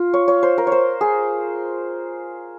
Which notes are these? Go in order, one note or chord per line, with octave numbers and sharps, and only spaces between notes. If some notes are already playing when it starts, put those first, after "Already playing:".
Already playing: F4
C#5
C#5
C5
A#4
C#5
C5
G#4